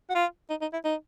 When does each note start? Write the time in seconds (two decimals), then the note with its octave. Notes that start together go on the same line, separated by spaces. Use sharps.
0.10 F#4
0.15 F4
0.50 D#4
0.61 D#4
0.73 E4
0.84 D#4